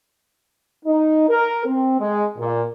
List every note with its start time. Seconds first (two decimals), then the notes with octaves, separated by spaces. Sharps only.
0.85 D#4
1.29 A#4
1.65 C4
1.99 G#3
2.38 A#2